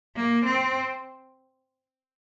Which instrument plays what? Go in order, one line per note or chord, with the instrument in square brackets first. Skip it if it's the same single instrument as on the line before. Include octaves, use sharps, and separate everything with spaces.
[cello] A#3
C4